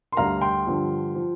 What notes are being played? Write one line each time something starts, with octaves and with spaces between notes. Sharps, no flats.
C6
D2 D3 G3 D4 F5 A#5
G5 C6
G2 D3 F3 D4
F3